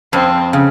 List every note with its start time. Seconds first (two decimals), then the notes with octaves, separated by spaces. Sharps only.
0.13 F2 C4
0.53 C#3